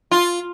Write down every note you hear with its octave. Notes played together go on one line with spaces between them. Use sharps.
F4